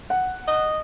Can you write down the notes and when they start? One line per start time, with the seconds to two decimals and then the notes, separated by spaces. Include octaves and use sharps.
0.10 F#5
0.48 D#5